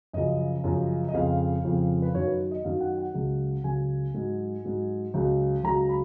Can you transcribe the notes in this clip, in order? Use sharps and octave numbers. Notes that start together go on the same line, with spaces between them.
F#2 C#3 F3 D#5
F#2 C#3 F3
D#5
F2 C#3 F3 F5
F2 C#3 F3
B4
F#2 D#3 F#3 C#5
B4
D#5
F#2 D#3 F#3 F5
F#5
F#5
C#2 C#3 F#3
C#2 C#3 F#3 G#5
G#2 F#3
G#2 F#3
C#2 C#3 F#3
C#2 C#3 F#3 A#5
B5